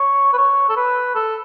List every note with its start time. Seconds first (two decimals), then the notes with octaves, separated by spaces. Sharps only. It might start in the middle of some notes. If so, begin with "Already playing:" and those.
Already playing: C#5
0.33 B4
0.38 C#5
0.69 A4
0.77 B4
1.15 A4